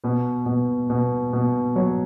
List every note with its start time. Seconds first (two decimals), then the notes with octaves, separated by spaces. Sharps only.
0.04 B2 B4
0.46 B2
0.90 B2
1.33 B2
1.76 F#3 C#5